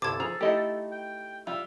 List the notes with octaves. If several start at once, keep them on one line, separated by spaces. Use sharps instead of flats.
G1 C2 A4 A5 D6 G#6
F3 G#4 A#5
A3 D#4 E4 G4 D#5
G5
G3 F4 E5